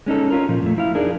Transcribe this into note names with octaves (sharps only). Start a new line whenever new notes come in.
G#3 C#4 D#4 A4
C#4 F4 A#4
A#2 F3
F2 A3
F3 E4 F5
D4 D#4 G#4 A#4